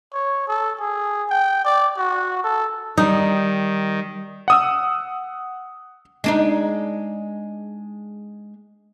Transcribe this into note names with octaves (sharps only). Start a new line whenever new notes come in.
C#5
A4
G#4
G5
D5
F#4
A4
D#3 G3 D#4
F#5 D#6 E6
G#3 D4 D#4